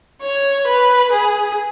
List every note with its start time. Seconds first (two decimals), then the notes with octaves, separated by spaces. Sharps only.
0.23 C#5
0.68 B4
1.12 G#4